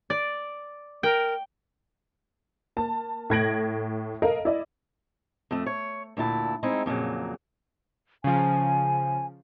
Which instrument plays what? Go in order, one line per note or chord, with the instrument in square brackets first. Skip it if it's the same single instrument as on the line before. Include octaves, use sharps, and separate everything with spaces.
[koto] D5
[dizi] A#4 [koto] G5
[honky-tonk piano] A#3 A5
A2 A3 G#6 A#6 D7 F#7
A4 A#4 D#5 F5
E4 D5 D#5
[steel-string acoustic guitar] F2 A3
C#5
D2 A#2 E4 A5
G#3 C4 D#4 E4
F2 A#2 C#3 F#3
[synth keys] C#3 F3 [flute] G#5